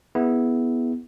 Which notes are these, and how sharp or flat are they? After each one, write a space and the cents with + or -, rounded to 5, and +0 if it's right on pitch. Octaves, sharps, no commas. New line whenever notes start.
B3 +0 E4 -10 G#4 +0